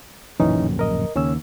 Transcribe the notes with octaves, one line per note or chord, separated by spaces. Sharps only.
D1 A#1 F#2 E3 C#4 D#4
A#4 D#5
D#2 C#3 C#4 E6